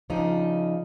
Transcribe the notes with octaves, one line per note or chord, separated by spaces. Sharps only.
C#3 F3 D4 D#4